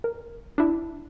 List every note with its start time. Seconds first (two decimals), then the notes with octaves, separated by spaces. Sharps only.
0.04 A#4
0.58 D4 E4